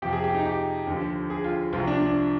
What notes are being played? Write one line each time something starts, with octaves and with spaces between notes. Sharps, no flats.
F2 C3 F3 G4
G#4
G4
D#4
G4
D#2 D3 F3
G#4
F4
C2 C3 F3 F4
D4
D4